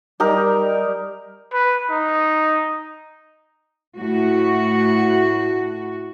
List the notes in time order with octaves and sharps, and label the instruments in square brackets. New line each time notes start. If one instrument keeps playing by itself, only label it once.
[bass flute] G3 [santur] D#4 G4 A#4
[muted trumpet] B4
D#4
[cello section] A2 F#4